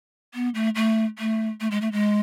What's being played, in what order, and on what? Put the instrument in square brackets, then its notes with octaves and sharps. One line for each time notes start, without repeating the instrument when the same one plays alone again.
[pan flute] B3
A3
A3
A3
A3
G#3
A3
G#3